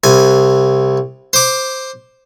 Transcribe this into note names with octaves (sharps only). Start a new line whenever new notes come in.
C2 G#5
C5 D6